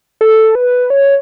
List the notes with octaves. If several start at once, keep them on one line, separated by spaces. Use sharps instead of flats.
A4
B4
C#5